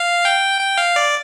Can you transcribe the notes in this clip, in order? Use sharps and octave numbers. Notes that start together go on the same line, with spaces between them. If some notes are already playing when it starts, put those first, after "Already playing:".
Already playing: F5
G5
G5
F5
D5